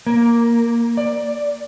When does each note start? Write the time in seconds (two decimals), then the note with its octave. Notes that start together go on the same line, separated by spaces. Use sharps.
0.07 A#3
0.97 D5